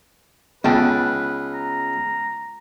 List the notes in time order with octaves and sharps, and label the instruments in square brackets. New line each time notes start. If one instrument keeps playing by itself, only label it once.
[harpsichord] C#2 [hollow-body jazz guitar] B3 G5 A5 [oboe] B4
[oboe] A#5